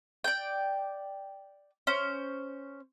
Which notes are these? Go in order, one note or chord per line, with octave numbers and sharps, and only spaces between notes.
D5 G5
C#4 C5